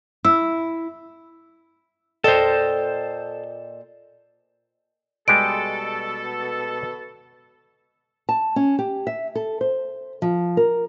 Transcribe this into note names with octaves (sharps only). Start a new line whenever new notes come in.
E4 E6
A#2 A4 C5 D#5 G5
B2 G3 G#3 G4 A4 D7
A5
C#4
G4
E5
A4
C5
F3
A#4